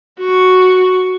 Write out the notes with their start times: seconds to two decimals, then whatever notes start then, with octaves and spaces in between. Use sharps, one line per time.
0.20 F#4 C#6